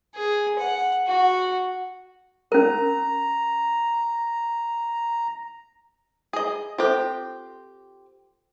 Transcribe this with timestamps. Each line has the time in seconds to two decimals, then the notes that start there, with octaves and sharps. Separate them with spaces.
0.15 G#4
0.59 F#5
1.07 F#4
2.52 C#4 A#4 A#5
6.33 G#4 D#5
6.78 C4 F4 G4 A4 C5